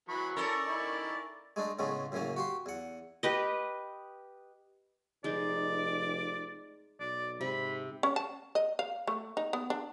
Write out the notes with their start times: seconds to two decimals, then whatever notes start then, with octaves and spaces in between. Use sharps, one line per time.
0.09 E3 F#3 B5 C#6
0.36 C#4 E4 A4 A#4 D5
0.66 D#3 E4
1.56 G#3 A3 D4 D#4
1.79 A2 C#3 G#3 A3 B3
2.12 F#2 A2 C#3 E3 A#3
2.36 F#4 G4 C6
2.66 E2 F#5
3.23 G4 B4 D#5
5.24 F1 G#3 D#4 D5
7.00 B1 D5
7.41 G#2 C3 B5
8.03 C#4
8.16 A5
8.55 D#5
8.79 F5
9.07 A3
9.37 D#4
9.53 B3
9.70 D4